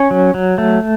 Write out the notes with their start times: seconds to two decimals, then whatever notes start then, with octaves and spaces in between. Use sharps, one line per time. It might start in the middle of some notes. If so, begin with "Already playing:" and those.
Already playing: C#4
0.11 F#3
0.34 F#3
0.58 A3